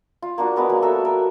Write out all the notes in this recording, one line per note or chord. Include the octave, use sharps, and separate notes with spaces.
F4
A#3 D4 F#4
G#3 B3 A#4
F#3 A#3
F#4 A4 E5
A#4